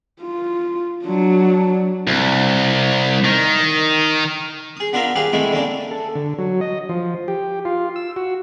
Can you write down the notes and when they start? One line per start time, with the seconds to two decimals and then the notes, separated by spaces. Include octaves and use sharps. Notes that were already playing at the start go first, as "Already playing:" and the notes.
0.22 F4
1.05 F#3 D4
2.07 C2
3.25 D#3
4.77 G#4 D#6
4.93 B3 D4 F4 A#4 E5 F5
5.16 G4 G#4 B4 F5
5.33 C3 E3 G#3 A3 E4
5.52 D3 A#3 C#4 D4
5.91 A4
6.15 D3
6.38 F#3
6.61 D#5
6.89 F3
7.28 G4
7.65 F4
7.96 E6
8.16 F#4